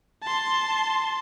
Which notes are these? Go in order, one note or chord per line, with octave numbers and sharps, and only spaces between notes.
A5 C6